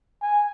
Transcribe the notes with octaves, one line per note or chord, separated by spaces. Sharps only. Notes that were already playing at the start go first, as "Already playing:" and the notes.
G#5